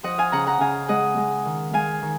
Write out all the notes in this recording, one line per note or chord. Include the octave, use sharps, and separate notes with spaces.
F3 D#5 F#5
F5 G#5
C#3 F#5 A#5
F#5 A#5
C#3 F5 G#5
G#3 D#5 F#5
G#3
D#3
G#3 F5 G#5
D#3